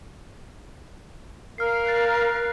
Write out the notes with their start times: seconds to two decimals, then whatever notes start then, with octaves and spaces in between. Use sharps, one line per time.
1.58 A#4 F5 F6 C7
1.86 F#6 A6